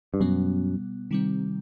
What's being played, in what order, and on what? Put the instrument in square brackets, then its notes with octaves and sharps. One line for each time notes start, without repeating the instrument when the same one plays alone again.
[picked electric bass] G2
[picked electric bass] F#2 [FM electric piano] B2 G3 B3
[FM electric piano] C3 D#3 G3 C4